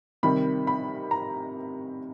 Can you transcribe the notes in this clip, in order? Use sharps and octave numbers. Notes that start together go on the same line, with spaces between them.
C3 D#3 G3 B5
B5
A#5